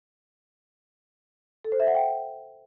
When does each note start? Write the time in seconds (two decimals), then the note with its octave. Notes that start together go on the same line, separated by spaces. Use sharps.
1.64 A4
1.72 C5
1.80 E5
1.87 F#5
1.95 G5